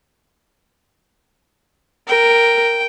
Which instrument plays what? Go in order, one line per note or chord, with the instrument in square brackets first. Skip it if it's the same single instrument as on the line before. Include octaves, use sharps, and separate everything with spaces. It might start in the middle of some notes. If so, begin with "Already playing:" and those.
[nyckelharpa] A#4 [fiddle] G5